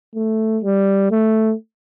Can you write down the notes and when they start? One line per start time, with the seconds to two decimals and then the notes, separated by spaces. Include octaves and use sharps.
0.15 A3
0.64 G3
1.11 A3